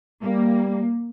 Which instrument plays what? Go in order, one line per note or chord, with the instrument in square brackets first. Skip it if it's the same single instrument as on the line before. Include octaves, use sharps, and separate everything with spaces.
[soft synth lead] G3 [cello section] A#3